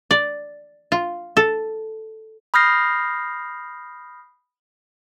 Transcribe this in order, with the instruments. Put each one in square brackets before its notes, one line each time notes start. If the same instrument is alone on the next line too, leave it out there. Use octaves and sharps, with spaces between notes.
[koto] D5
F4
A4
[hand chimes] B5 D#6 F6 G6 A#6 C7